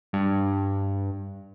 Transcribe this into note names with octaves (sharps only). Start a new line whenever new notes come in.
G2